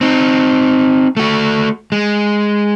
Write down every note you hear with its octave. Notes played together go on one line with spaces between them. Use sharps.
C4 D#4
A3 F#4
G#3